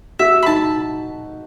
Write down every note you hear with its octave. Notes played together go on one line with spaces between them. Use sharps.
F#4 E5
B5
D#4 A5